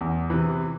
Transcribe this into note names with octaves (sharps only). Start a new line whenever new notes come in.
E2
C3 E3